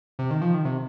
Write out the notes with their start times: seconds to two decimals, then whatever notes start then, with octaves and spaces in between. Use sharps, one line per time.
0.19 C3
0.31 D#3
0.42 F3
0.54 D#3
0.65 C3